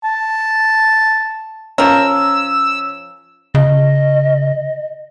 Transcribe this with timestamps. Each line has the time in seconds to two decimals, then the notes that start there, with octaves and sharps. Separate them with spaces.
0.04 A5
1.78 F3 C#4 A#4 E6
3.55 C#3 D#5